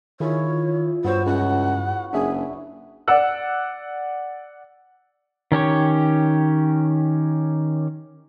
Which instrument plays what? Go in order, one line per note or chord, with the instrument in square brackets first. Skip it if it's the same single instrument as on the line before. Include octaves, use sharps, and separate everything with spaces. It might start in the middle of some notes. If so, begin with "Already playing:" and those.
[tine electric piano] D#3 [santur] E4 F4 G#4 [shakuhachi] C#5
[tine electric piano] G2 [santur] B3 F#4 C#5 [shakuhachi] C5
[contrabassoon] C#2 [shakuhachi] F#5
[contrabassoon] F#1 [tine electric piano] D4 E5 [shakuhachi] G#4
[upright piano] D5 F#5 E6 F#6
[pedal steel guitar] D#3 C#4 G4 C#5